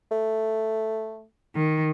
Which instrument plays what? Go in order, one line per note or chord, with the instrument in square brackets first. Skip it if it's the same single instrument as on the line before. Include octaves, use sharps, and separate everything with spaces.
[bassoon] A3
[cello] D#3